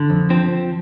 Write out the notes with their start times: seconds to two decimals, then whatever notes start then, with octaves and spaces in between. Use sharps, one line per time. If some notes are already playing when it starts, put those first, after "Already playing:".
Already playing: D3
0.10 F2
0.30 F3 C4